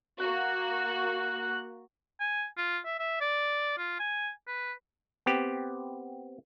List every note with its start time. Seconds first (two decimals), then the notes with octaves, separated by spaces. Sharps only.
0.20 A#3 F#4 F#6
2.20 G#5
2.57 F4
2.85 E5
2.99 E5
3.21 D5
3.78 F4
4.00 G#5
4.47 B4
5.26 B3 C4 G4